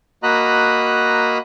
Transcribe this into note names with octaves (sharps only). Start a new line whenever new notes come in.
A#3 F#4 D#5 A#5 B5 F#6